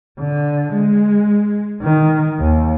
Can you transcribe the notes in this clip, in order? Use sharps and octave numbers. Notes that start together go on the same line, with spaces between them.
D3
G#3
D#3
D#2